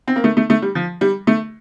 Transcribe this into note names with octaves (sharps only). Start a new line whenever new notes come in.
C4
A#3
A3
A3
A3
G3
F3
G3
A3